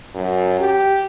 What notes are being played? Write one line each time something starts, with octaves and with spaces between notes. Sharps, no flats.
F#2
G4